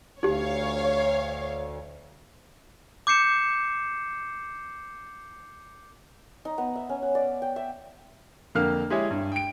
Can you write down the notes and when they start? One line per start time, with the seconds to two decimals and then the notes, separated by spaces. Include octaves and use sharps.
0.23 D2 D#4 G4 C#5 F5
3.07 D6 G6 C7 C#7 E7
6.45 D#4
6.58 B3
6.75 E5
6.89 C#4
7.02 F#5
7.15 D5
7.42 G5
7.56 E5
8.55 F2 D3 A#3 F5 F6
8.90 G#3 E4 G4 G#4 C#5 E5
9.10 G2
9.32 G5 D7